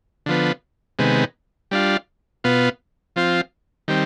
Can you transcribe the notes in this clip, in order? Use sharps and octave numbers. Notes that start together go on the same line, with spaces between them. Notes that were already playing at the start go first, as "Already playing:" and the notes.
D3 F3 B3
C3 D#3 G#3 B3
G3 D4 F4
B2 B3 F4
F3 C4 F4
D#3 G3 C4